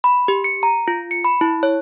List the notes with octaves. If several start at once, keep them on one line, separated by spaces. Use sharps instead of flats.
B5
G4
C#7
A#5
F4
C#7
B5
E4
C#5